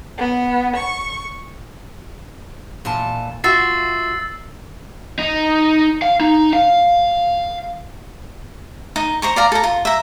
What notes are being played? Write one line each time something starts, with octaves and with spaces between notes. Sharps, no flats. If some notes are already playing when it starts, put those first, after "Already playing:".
B3
C#6
A#2 E3 A5
F4 F#4 E5 E6 A6 C7
D#4
F5
D#4
F5
D#4
C5 A#5 C#6
D5 F5 A#5
A4 A#5
F4
E5 A#5